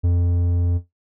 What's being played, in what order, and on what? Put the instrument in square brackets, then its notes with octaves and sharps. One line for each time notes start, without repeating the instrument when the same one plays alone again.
[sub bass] F2